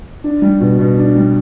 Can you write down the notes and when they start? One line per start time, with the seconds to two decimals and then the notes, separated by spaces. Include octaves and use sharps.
0.24 D4
0.42 G3
0.60 B2
0.79 B2
0.98 D4
1.15 G3